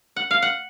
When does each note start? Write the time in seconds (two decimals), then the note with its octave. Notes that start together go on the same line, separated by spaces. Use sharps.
0.16 F#5
0.31 F5
0.42 F#5